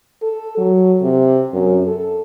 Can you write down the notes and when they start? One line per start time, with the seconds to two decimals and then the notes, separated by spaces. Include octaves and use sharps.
0.23 A4
0.58 F#3
1.02 C3
1.53 F#2
1.87 A4